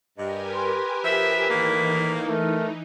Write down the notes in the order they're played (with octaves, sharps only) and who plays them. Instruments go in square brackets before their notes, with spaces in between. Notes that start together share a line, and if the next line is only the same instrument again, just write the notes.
[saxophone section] G2 [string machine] G4 A#4 G#5 [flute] D#5
[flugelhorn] B4 [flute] C6
[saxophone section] F3 E5 [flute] B6
[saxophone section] A2 D#3 A#3 [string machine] E3 D#4
[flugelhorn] A3 [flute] A#4